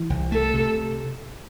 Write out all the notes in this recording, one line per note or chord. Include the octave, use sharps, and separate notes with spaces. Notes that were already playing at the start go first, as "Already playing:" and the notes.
Already playing: E3
C2
A3 A4
C3